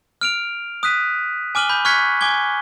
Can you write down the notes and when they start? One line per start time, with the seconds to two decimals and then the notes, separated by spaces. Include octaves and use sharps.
0.21 F6 D7 F7
0.83 D#6 F#6 B6 D#7
1.55 G#5 D6 F6 D#7 F#7 G7
1.69 B5 G6
1.85 C#6 F6 F#6 G#6 B6 C#7
2.21 G#5 D6 G#6 G7